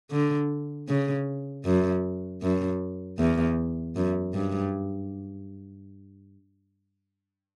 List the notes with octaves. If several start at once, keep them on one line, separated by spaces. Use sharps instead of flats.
D3
C#3
F#2
F#2
E2
F#2
G2